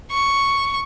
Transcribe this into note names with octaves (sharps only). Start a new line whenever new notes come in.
C#6